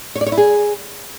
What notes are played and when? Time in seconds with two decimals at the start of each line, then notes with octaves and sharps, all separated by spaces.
0.16 C#5
0.21 D5
0.27 C#5
0.32 E4
0.38 G#4